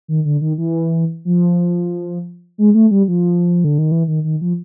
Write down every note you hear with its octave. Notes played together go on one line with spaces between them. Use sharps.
D#3
D3
D#3
E3
F3
G#3
A3
G3
F3
D3
D#3
E3
D#3
D#3
F3